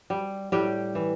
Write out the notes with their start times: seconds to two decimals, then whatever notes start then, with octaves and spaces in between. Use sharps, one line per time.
0.10 G3
0.52 A2 G3 G4
0.95 E3